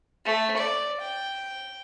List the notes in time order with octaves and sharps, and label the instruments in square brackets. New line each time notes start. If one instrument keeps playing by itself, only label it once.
[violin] A3
D5
G5